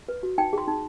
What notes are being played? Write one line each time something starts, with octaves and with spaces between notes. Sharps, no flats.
B4
F#4
D#4 G5
G#4 C6
D#4